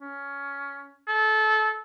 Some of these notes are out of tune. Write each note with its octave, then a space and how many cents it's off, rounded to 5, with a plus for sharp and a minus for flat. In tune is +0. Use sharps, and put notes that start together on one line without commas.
C#4 +15
A4 -25